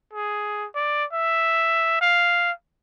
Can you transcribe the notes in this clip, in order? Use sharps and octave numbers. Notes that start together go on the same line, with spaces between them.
G#4
D5
E5
F5